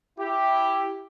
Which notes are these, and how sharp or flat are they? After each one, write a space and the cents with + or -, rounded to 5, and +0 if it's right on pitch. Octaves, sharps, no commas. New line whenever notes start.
E4 +0 G4 +0